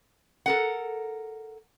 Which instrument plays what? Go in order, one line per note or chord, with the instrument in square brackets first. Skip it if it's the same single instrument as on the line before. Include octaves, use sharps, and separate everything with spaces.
[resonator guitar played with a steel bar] A4 A#4 F#5